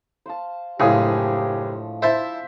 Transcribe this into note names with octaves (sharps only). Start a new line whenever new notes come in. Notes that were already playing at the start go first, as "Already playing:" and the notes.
C5 F5 A5
F#1 A2 F3 G#3 D4 G4 G#4 D#6
E4 C5 E5 A5